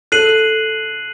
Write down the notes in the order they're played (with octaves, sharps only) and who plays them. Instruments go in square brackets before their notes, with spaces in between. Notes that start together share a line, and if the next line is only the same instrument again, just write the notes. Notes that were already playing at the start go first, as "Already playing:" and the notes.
[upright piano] A4 [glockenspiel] F#6 C7 D#7 F#7